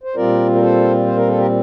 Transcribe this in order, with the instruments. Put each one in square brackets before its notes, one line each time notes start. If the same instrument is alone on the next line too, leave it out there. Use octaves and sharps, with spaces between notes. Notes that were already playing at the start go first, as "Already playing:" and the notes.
[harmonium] C5
A#2 G3 C4 F4 A#4 D5
A#4
A4 C5
C5
A#4
A4
G4 A#4